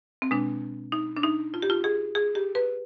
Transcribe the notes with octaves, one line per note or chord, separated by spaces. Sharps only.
C4
B2 G#3 D4
D#4
D4
D#4
F4
G4
F4
G#4
G#4
G4
B4